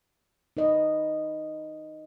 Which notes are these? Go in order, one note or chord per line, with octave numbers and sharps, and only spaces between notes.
D#4 B4 D#5